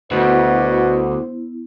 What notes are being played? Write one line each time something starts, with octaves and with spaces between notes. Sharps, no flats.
D2 B2 B3 E4 C5